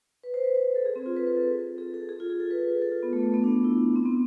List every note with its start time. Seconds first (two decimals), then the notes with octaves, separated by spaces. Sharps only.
0.23 B4
0.34 C5
0.44 B4
0.55 C5
0.76 A4
0.86 G#4
0.96 C4
1.06 F4
1.16 B4
1.27 B4
1.37 A4
1.78 G#4
1.94 A4
2.09 G#4
2.20 F4
2.30 G#4
2.40 A4
2.51 B4
2.61 B4
2.72 A4
2.82 A4
2.92 F4
3.03 B3
3.13 A3
3.23 A3
3.34 B3
3.44 D4
3.64 E4
3.96 C4
4.06 B3